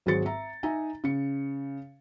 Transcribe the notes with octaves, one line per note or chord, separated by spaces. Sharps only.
G#1 F#3 G#4 C5 A6 C#7
E5 A#5
D#4 E5 G#5 A#5
C#3 C#7